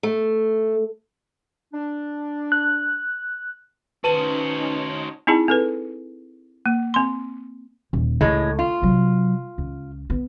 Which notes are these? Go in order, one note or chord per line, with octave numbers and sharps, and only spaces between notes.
A3
D4
F#6
C#4 D#4 F#4 B4 C5 A5 D#7 F#7
C4 D#4 E4 G#4 A5
C4 A4 B4
A#3
C4 C6
D#1
C#2 A2 G#3
F4
C3 F#3
C#2
B3